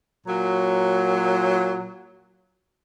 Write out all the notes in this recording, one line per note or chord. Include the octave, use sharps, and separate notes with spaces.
A#2 F#3